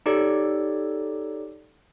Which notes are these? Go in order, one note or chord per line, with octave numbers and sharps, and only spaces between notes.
D#4 G4 A4 C#5 D5